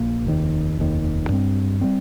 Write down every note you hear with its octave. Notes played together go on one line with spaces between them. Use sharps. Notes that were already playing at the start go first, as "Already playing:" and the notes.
Already playing: A#1 A#3
F1 D#2 D#3
F1 D#2 D#3
G2 G3 C4
G3 C4